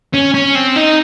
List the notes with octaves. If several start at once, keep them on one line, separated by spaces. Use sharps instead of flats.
C#4
C#4
C4
D#4